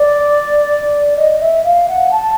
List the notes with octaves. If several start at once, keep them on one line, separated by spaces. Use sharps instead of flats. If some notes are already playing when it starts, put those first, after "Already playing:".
Already playing: D5
D#5
E5
F5
F#5
A5